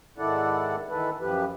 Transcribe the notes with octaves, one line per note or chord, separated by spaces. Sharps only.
G#2 D#3 E4 A4 D5 F#5
D#3 E3 A4 B4
F#2 F3 G4 B4